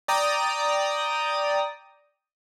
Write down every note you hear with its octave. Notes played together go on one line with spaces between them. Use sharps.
D5 G5 A#5 D#6